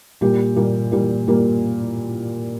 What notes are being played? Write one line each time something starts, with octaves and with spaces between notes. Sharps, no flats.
A#2 G3 A#3 G4
A#2 G3 A#3
A#2 G3 A#3
A#2 G3 A#3